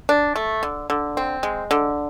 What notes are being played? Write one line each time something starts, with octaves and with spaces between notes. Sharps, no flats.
D4
A3
D3
D3
C4
G#3
D3